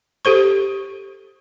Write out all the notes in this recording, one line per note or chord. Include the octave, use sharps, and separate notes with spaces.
G4 A4 C5 C#6